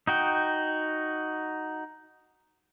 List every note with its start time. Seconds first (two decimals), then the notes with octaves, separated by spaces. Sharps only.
0.07 D#4 F#4 G5